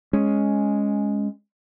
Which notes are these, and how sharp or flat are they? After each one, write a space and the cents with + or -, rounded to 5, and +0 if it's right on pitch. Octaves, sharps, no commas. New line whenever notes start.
G#3 +0 C#4 +0